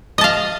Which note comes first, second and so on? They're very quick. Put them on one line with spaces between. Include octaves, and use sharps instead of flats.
D#5 A5 F5